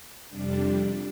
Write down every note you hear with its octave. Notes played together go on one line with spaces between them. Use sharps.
F2 C3 G3 D4